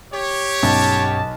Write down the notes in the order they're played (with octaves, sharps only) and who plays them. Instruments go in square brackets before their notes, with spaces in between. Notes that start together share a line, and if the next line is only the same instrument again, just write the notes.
[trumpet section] G4 C#5
[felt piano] B1 [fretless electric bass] G2 C#4 [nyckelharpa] A5